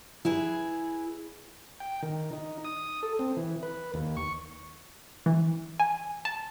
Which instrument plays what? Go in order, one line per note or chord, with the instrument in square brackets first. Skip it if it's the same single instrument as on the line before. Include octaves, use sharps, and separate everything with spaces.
[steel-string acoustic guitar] E4 G#4 B4
[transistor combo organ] G5
D#3
D#4
D#6
A4
C4
E3
B4
D#2
C#6
[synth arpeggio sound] E3
G#5
A5